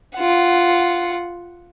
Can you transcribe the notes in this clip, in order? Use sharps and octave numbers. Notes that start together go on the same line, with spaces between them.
F4 F#5